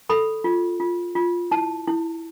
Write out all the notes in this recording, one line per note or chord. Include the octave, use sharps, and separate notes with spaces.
A4 B5
F4
F4
F4
E4 A5
E4